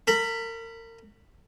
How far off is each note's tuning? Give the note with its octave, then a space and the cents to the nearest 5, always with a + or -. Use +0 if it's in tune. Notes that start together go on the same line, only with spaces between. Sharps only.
A#4 -35 B5 +0